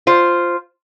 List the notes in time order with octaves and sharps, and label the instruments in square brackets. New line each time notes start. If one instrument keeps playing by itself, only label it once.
[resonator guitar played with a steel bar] F4 C5